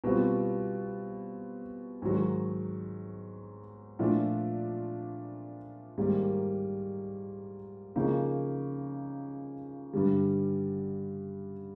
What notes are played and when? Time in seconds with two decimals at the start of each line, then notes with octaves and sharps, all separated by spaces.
0.04 B2 G3 C4 F4
2.02 G#2 D#3 F#3
3.99 A#2 F3 A3 D4 F4
5.98 G#2 D#3 G3 A#3
7.96 C#3 F3 A#3 D#4
9.93 G2 D3 G3